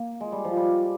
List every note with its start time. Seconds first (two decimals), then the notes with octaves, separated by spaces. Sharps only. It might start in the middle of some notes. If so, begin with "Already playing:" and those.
Already playing: A#3
0.21 G#3
0.32 G3
0.44 F3
0.57 G3